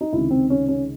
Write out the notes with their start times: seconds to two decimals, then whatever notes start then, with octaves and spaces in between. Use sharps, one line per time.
0.01 D#4
0.13 C#2 C3 D#3 E4
0.30 C4
0.50 C#4
0.68 C#4